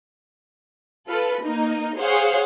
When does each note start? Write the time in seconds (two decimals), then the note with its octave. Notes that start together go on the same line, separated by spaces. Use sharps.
1.08 F4 A4 B4
1.43 A#3 D#4
1.97 G#4 C5 C#5 F5 F#5